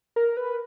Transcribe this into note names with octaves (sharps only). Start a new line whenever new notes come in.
A#4
B4